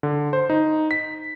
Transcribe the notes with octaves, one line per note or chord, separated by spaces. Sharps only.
D3
C5
D#4
B6